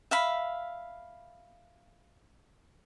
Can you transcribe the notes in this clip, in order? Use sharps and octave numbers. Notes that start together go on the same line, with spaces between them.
E5 F5 B5